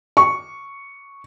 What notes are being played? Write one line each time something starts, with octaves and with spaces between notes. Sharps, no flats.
C#6